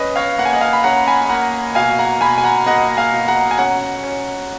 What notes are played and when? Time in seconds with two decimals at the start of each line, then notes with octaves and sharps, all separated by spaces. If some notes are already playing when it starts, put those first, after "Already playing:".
Already playing: C#4 B4 D#5
0.16 C#5 F5
0.38 A#3 F#5
0.45 G#5
0.53 D#5 F#5
0.61 F5 G#5
0.73 B5
0.84 C#4 F#5 A#5
1.07 G#5 B5
1.25 B5
1.29 A#3 F#5 A#5
1.75 B2 F5 G#5
1.99 F#5 A#5
2.21 B2 G#5 B5
2.38 G#5
2.44 F#5 A#5
2.66 A#3 D#5 F#5
2.97 F5 G#5
3.12 B2
3.28 F#5 A#5
3.51 G#5
3.58 C#4 F#5 A#5
4.03 C#4